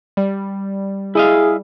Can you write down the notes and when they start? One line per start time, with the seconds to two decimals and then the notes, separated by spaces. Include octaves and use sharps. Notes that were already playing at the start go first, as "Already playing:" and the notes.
0.17 G3
1.15 E4 G#4 D#5 F5